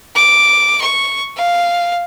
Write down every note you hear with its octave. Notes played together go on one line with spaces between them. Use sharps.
D6
C#6
F5